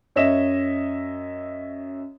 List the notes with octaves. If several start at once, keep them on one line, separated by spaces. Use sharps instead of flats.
F#2 C#5 D#5 E5 E7